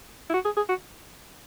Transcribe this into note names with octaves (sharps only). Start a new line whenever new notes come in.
E4
F#4
G#4
G#4
F#4